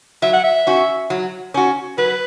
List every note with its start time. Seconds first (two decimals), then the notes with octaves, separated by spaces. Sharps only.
0.22 F#3 E5
0.33 F#5
0.44 E5
0.67 C#4 F#4
1.10 F#3
1.54 C#4 F#4
1.98 F#3 B4